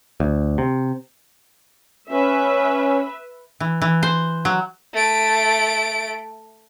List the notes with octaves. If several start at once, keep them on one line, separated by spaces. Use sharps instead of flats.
D2
C3
C#4 B4 E5
E3
E3
C5
F#3
A3 D7